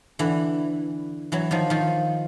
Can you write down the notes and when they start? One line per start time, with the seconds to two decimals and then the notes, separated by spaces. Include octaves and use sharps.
0.19 D3 E3
1.32 E3 F#3
1.51 D#3 F3
1.70 D#3 F3